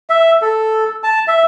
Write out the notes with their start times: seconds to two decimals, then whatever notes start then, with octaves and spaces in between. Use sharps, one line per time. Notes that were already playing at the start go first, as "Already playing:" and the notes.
0.10 E5
0.42 A4
1.04 A5
1.28 E5